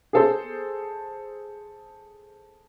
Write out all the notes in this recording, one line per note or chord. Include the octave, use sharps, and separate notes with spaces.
G#4 A4 C5